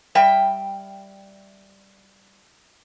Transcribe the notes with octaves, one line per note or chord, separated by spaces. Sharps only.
G3 E5 G5